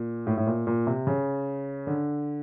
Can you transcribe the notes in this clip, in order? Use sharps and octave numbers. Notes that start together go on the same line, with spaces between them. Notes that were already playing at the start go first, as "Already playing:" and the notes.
Already playing: A#2
A2
A2
A#2
A#2
C3
C#3
D3